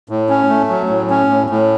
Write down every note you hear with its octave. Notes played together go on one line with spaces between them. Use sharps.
A2
C#4
A3
F#3
A2
C#4
A2
A2